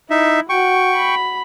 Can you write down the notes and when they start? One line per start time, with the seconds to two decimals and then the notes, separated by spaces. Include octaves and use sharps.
0.10 D#4 E4 E5
0.49 F#4 G5 C#6
0.95 B5